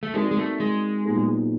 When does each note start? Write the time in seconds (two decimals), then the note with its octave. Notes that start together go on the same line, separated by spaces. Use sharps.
0.03 A3
0.14 G#3 C4 D#4 F#4 A#4 D5
0.31 G#3
0.37 A3
0.60 G#3
1.05 A#2 F#3 B3 D#4 G#4